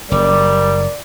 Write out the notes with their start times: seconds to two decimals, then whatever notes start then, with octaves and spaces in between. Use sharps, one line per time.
0.11 F#1 G3 A#4 D5